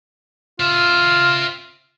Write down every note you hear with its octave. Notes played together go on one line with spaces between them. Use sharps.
F4 C5 E5